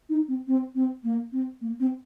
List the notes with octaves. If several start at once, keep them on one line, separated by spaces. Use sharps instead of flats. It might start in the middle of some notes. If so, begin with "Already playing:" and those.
D#4
C4
C4
C4
A#3
C4
A#3
C4